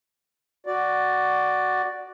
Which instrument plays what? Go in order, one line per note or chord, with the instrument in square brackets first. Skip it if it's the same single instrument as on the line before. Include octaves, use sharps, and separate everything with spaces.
[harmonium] F#4 D5